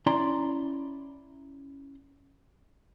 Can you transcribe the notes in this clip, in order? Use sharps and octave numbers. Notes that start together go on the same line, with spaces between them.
C#4 E4 D5 A#5 C6